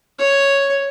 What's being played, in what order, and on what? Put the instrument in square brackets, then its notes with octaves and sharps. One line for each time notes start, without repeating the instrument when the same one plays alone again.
[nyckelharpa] C#5